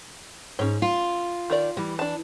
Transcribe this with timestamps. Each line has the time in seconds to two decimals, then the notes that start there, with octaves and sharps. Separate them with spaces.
0.59 G#2 C#4 C#5
0.82 F4
1.50 D#3 A#4 D5
1.77 E3 G3
1.99 D4 A5